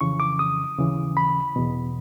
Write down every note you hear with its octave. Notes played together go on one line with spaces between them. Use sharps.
F2 C#3 E3 C#6
D6
D#6
D#2 C#3 E3
B5
E2 B2